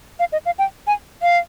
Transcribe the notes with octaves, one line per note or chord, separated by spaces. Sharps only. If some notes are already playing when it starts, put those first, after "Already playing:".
F5
D#5
F5
G5
G#5
F5